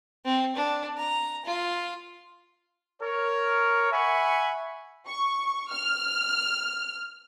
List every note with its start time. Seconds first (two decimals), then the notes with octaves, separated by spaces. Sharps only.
0.25 C4
0.56 D4
0.98 A#5
1.46 F4
3.01 A#4 C#5
3.91 E5 F#5 G#5 B5 C#6
5.07 C#6
5.70 F6